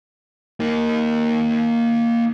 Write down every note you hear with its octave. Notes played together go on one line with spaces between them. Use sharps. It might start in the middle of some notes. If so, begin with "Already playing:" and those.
A#3 D#4